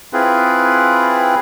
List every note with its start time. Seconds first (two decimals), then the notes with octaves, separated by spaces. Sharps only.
0.13 C4 E4 F4 G#4 B4